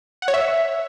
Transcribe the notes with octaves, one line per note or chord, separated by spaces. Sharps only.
F#5
C#5
E5